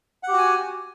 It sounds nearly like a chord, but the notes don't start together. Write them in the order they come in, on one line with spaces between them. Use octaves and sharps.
F#5 G4 F#4 G#5